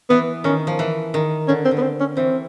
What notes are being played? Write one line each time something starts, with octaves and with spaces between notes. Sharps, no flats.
E3 B3
D#3 C#4
F3
E3
D#3
D3 C#4
C4
D3
B3
C4
C#4
E3 C4